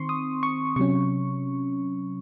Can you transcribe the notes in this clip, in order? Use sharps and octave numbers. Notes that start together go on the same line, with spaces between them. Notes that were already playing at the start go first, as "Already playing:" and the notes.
Already playing: D#3 C4 C6 C#6
D#6
C#6
C3 F#3 C#4 C#6